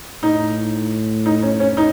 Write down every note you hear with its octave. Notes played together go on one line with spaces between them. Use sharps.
A2 D#4
D#4
C#4
C#4
D#4